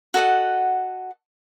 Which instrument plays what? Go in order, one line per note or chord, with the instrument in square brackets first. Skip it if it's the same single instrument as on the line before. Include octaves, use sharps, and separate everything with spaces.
[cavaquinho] F#4 A4 D#5 F#5